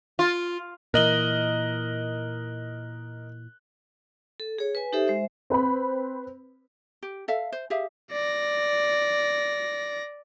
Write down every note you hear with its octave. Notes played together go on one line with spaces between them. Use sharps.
F4
A#2 E3 A#4 D#5 F#6 F#7 G7
A4
G#4 C#5
B4 G#5
D#4 G4 A4 C5 E5
G#3 C5 E5
C4 B4 C5 B5
G4
A4 E5 F5
C5
G4 G#4 E5 F5
D5 A#6